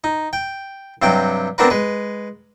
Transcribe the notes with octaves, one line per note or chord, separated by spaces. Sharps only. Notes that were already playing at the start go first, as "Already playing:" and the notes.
D#4
G5
G2 C3 F#3 G5 D6
B3 C4 D4 F#4 A#4 B4
G#3 B4